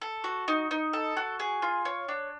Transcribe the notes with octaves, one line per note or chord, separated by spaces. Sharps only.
A4
F#4
D#4
D#4
A4
F#4
G#4
F4
C#5
D4